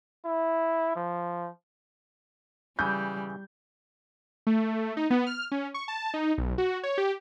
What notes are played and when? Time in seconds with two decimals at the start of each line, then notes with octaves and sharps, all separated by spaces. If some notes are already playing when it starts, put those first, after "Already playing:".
0.25 E4
0.96 F3
2.79 C#3 E3 G3 G6
4.47 A3
4.97 D#4
5.10 B3
5.27 F6
5.52 C#4
5.74 C#6
5.88 A5
6.14 D#4
6.38 B1
6.58 F#4
6.83 C#5
6.98 G4